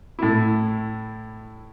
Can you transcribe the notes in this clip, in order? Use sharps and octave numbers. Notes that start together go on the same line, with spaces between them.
A2 E4